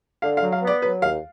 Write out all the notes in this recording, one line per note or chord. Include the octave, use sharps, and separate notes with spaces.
D3 F5
F5
F#3
F5
B3
D5
F#3 B4
D#2 F5